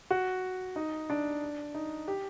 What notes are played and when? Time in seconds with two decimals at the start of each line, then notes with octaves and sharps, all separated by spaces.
0.10 F#4
0.76 D#4
1.10 D4
1.74 D#4
2.08 G4